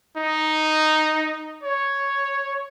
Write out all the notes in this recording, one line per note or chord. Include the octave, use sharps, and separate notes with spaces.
D#4
C#5